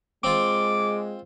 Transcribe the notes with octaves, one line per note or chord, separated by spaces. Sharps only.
G#3 C4 F4 D6